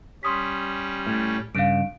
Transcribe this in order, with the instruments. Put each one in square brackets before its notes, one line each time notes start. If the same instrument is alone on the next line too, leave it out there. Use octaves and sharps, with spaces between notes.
[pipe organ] G3 C#4 [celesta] C6 D#6 B6
[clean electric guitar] A2
[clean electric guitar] G2 C#3 [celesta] F5 D7